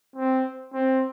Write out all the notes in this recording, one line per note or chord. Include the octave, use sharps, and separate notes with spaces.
C4
C4